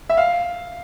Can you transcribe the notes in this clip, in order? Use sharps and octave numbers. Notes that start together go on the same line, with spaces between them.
E5
F5